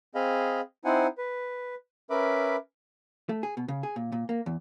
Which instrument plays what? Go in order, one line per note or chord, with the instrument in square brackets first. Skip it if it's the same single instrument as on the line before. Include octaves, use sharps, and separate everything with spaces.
[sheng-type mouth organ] C4 G#4 D#5 F5 B5
C4 D#4 E4 C5 F#5 G#5
B4
C#4 A#4 B4 E5 B5 D6
[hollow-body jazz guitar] A3
G#4
B2
C#3
G#4
A#2
A#2
A#3
E2